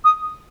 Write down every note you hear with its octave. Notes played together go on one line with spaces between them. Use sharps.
D#6